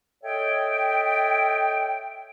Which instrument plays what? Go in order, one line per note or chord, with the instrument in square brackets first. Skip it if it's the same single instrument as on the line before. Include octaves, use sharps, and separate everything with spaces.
[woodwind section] A4 C#5 D#5 E5 G5